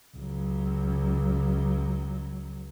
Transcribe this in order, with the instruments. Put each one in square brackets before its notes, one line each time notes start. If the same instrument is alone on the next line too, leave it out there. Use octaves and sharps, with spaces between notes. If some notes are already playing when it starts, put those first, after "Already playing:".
[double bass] C#2 F#3